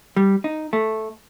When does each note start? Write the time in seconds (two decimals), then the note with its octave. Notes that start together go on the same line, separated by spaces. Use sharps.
0.16 G3
0.44 D#4
0.73 A3